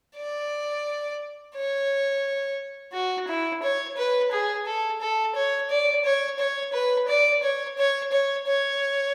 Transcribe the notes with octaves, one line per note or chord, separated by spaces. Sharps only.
D5
C#5
F#4
E4
C#5
B4
G#4
A4
A4
C#5
D5
C#5
C#5
B4
D5
C#5
C#5
C#5
C#5